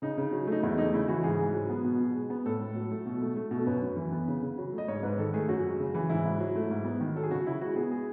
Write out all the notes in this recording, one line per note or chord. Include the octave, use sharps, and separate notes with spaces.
C#3 D#4
C#3
F#3
A3 D#4
E2 E4
A3 D#4
C#3 E4
E3 F#4
G#2 G#4
G#2
F#3
B3
B2
B2
G#3
B3
A2 A4
A2
F#3
A3
B2
A3
A3
B2
A4
F#2 B4
F#2
E3
B3
C#3
C#3
F#3
A3
D#5
G#2 C#5
G#2 B4
D#3 A4
A3 G#4
F#2 F#4
G#3
C#3
E3
G#2 E4
G#2
F#3
A3
G#2
B3
D#3
F#3 A4
G#4
C#3 F#4
C#3 E4
G#3 F#4
B3 G#4
G#4